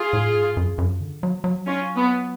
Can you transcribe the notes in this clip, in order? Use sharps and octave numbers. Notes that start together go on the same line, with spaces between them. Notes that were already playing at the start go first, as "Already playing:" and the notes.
Already playing: F4 G#4
A2
G#2
F#2
F#2
D3
F#3
F#3
C#4 F4
B3